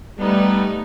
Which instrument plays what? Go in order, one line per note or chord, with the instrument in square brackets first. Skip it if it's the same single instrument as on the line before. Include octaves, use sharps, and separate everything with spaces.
[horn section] G3 [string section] A3 B3 D#4